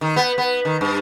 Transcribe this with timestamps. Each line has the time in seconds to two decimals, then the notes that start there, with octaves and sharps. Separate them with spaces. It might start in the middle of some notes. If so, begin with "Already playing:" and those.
0.01 D#3
0.16 B3
0.38 B3
0.65 D#3
0.81 G2